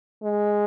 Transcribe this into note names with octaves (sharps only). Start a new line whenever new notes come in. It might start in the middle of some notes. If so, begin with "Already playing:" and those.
G#3